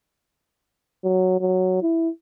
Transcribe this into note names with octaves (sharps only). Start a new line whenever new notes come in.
F#3
F#3
E4